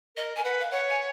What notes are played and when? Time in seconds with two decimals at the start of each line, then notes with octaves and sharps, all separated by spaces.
0.16 A#4 D#5
0.36 A#4 G#5
0.43 B4 F#5
0.60 F5
0.70 C#5 F#5
0.90 G#5